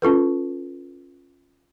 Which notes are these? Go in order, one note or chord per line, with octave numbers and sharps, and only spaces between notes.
C#4 F4 A4 B4